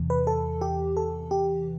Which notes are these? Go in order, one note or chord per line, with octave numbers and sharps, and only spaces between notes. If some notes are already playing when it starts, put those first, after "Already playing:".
Already playing: E2 C3 E3
B4
A4
G4
A4
G4